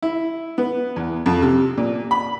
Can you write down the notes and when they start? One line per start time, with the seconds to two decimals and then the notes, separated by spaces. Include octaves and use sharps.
0.03 E4
0.58 B3
0.96 E2
1.26 F2
1.42 C3
1.78 A#2
2.11 B5